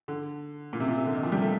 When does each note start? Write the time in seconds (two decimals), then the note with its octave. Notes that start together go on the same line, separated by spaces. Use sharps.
0.08 D3
0.73 A#2
0.80 C3
0.88 A#2
0.97 C3
1.06 D3
1.15 D#3
1.23 F3
1.32 G3
1.42 A3